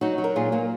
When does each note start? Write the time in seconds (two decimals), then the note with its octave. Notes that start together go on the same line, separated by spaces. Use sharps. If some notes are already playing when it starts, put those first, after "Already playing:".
0.01 F#3 D#4 F#4
0.18 F#3
0.24 A#4
0.36 A#2 F4 G#4
0.52 A#2 A#3